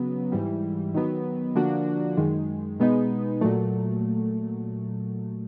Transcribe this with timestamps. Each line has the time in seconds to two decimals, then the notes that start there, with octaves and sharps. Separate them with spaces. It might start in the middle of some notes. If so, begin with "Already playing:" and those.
Already playing: C#3 F#3 B3
0.32 G#2 E3 G3
0.94 D#3 F#3 B3
1.55 D3 F3 A#3 D4 F#4
2.17 F#2 D#3 G#3
2.80 B2 G#3 B3 D#4
3.41 A#2 F#3 A3